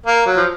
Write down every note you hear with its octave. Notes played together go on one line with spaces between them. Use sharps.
A#3
F#3
F3